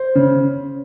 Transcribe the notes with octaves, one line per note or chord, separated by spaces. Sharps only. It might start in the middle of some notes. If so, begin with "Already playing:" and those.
Already playing: C5
C#3